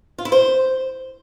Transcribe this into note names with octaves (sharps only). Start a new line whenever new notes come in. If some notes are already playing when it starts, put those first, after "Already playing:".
F4
E4
C5